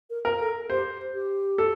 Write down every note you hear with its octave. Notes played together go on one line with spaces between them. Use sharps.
A#4
A#4
A4
G4 C5
G4
A4